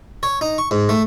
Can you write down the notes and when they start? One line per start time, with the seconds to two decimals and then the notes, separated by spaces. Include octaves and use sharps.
0.23 C#5
0.41 D#4
0.58 C#6
0.71 G#2
0.89 A3